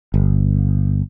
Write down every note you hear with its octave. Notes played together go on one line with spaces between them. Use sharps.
G1